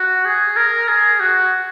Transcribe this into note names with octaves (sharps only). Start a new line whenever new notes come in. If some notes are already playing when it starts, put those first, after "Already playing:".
Already playing: F#4
G#4
A#4
G#4
F#4